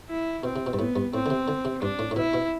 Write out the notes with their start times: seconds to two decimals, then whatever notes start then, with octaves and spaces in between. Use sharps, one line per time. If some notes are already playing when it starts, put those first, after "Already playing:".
0.09 E4
0.43 B2 C4
0.56 C3
0.66 B2
0.73 G2
0.78 A2 B3
0.96 G2
1.13 A2 C4
1.26 D3
1.30 C3
1.48 D3
1.65 C3
1.82 G2 D4
1.99 A2
2.11 A2
2.16 B2 E4
2.34 B2